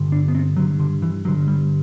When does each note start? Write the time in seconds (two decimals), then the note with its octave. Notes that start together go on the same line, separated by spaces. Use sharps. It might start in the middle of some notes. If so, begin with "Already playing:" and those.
Already playing: G2 D3
0.12 D4
0.28 B3
0.35 C4
0.57 G2 D3 F#3
0.80 D3
1.02 E3
1.25 G2 D3 F#3
1.48 G3